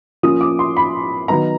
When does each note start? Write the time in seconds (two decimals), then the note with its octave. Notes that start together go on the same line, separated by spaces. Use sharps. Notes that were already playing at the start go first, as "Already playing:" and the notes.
0.23 F3 A#3 C#4 F4 D#6
0.41 D6
0.59 C6
0.77 B5
1.28 D#3 F#3 B3 D#4 A#5